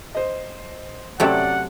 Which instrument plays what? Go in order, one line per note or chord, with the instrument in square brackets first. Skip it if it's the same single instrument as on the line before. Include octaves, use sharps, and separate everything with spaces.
[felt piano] C5 D#5
[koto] C3 F#3 A3 [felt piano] C#4 D5 [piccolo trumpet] F#5